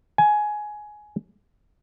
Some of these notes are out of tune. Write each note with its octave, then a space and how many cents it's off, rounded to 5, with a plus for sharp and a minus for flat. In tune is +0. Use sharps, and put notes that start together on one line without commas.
G#5 +15